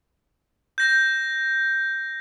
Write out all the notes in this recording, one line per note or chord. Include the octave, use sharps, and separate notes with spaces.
G6 A#6